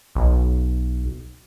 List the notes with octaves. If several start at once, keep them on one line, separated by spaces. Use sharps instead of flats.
B1